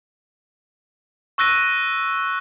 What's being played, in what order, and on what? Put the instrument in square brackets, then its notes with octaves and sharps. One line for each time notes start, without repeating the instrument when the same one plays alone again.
[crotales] C#6 E6 F#6 A#6 D#7